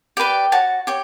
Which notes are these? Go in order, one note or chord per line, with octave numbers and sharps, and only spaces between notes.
G4 B4 D5 G5
F#4 C#5 A5
G4 C#5